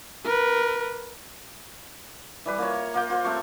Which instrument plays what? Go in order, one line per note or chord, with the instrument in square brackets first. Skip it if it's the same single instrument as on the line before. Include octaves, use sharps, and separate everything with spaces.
[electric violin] A#4 B4
[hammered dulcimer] E3 G3 B4
A#3 F4 C#5
A#3 F4 G5
F4 C5
A3 C4 G4 C#6